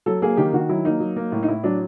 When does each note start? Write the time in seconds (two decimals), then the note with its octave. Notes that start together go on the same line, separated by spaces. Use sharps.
0.06 F#3 A4
0.22 A#3 G#4
0.37 D#3 G4
0.53 D#3 F#4
0.69 F#3 E4
0.85 A#3 D#4
1.00 F#3
1.16 A#3
1.32 A2
1.43 D#4
1.48 A2 E4
1.64 F#3 D4